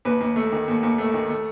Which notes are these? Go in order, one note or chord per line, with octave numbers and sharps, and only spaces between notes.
D#2 B4
D#2
A3
D#3
D#2
D#2
A3
D#3
A3